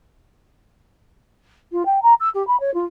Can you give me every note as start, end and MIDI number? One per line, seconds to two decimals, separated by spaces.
1.72 1.85 65
1.85 1.99 79
2.02 2.14 82
2.20 2.29 88
2.34 2.45 67
2.47 2.59 83
2.60 2.73 73
2.74 2.85 65